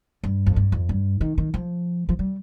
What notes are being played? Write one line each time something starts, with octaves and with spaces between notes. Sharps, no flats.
G2
F2
G2
F2
G2
D#3
D#3
F3
F3
G3